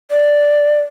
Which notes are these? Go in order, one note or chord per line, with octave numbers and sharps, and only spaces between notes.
D5